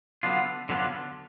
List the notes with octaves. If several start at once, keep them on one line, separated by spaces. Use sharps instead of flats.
D3 F#3 B3 D4 F4
D3 F#3 B3 D4 F4